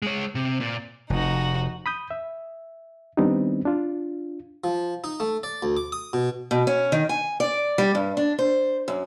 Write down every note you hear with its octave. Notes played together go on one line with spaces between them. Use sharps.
G#3 C#5
C3
A#2
F1 D#4 F#4
B5 D#6 G6
E5
D#3 G3 B3 C4 D4 D#4
D4 F4
F3
D#4
A3
D5
D2
D6
D#6
B2
B2
C#4
D#3
G#5
D5
G3
G2
D4
C5
F#2